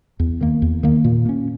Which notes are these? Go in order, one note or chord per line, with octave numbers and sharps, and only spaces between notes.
E2
D#3 A#3
E2
D#3 A#3
A#2
A#3 C#4